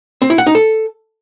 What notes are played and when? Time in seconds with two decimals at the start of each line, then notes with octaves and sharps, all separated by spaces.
0.22 C4
0.30 E4
0.38 F#5
0.47 D#4
0.55 A4